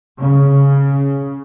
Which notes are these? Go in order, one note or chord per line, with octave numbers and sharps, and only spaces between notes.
C#3